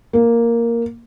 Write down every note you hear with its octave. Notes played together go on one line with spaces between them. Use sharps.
A#3